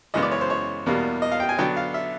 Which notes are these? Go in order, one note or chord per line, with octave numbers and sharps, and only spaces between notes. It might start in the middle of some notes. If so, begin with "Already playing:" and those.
F#2 C#3 E3 G#3 B3 D#5
D5
C#5
C5
C#5
E2 B2 G3 A#3
D#5
F5
G5
G#5
D3 F#3 B3 D4 G5
F5
E5